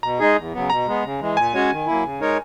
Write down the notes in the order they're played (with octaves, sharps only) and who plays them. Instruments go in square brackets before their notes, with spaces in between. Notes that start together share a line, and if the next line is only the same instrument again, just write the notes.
[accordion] B2 [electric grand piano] A#5
[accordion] G#3 D#4 G#4
E2
C#3 F#3 B3
[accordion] B2 [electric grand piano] A#5
[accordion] G#3 B3
C#3
E3 G#3
[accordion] A#2 [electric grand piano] G#5
[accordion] G#3 C#4 F#4 C#5
D#3
F#3 A#3 E4
C#3
G#3 D#4 A#4 C#5